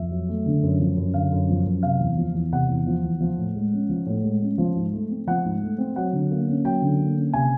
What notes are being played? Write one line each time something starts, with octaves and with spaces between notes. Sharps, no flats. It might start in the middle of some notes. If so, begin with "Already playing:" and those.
Already playing: F2 E5
F#3
A3
D3
F#2
F3
F#2
D3 F5
F#2
F3
F#2
C3 F5
E2
F3
E2
C3 F#5
E2
F3
E2
F3
A2
G#3
C#4
F3
A2
G#3
C#4
F3
G#2
A3
C4
F3 F#5
G#2
A3
C4
F#3 F#5
D3
A#3
C#4
F#3 G5
D3
A#3
C#4
C3 G#5